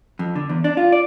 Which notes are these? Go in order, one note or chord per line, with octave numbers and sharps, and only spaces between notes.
F2
D3
E2
D4
F4
D5